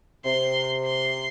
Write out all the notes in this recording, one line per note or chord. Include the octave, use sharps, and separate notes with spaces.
C3 C6
C6